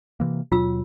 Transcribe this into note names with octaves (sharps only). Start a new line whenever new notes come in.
C3 E3 A#3
D#2 B2 F#3 F4 E6